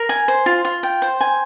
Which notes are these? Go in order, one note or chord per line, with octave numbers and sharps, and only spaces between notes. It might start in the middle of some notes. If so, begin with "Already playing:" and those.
Already playing: A#4
G#5
C5
F4
F4
G5
C5
G#5